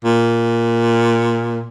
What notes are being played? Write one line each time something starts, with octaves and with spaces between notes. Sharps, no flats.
A#2